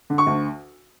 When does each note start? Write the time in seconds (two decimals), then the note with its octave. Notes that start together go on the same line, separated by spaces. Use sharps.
0.10 D3
0.18 C#6
0.26 D2